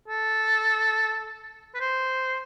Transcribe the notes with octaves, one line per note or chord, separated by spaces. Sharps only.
A4
B4
C5